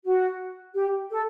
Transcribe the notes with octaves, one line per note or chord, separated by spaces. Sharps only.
F#4
G4
A4